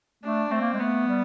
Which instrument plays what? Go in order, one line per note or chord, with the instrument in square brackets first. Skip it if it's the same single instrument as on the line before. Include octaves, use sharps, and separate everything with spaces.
[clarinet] A3 [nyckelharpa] D4
[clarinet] A3 [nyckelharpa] C4
[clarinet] A#3
G#3
[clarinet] A3 [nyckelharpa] B3
[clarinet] G3